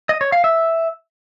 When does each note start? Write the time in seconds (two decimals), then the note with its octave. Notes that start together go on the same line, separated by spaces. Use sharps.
0.09 D#5
0.21 C#5
0.32 F5
0.44 E5